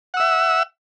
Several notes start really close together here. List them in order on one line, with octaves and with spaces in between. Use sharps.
F#5 E6 E5